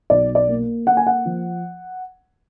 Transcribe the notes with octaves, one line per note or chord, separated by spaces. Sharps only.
B1 D5
D5
A#3
A#3 F#5
G#5
F#5
F3